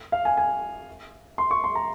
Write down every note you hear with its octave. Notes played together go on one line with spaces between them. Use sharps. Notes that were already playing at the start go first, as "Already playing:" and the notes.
F5
G#5
G#5
C6
C#6
C6
A#5